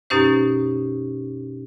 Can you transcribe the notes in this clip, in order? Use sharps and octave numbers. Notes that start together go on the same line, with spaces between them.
F#2 B2 C#4 D#4 G4 C5